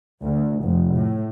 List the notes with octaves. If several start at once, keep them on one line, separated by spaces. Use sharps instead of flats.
D2
F1
A2